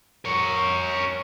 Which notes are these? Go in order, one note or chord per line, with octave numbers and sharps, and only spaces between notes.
A#4 C#5